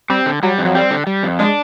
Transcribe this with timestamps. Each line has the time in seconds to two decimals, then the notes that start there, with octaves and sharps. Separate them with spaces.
0.10 G3 C4
0.26 D3
0.43 F#3 G3
0.59 F2
0.65 F#3
0.75 G3 C4
0.91 D3
1.07 G3
1.23 F2
1.39 G#3 D4